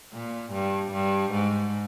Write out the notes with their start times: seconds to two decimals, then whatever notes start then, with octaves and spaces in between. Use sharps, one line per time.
0.14 A#2
0.53 G2
0.92 G2
1.32 G#2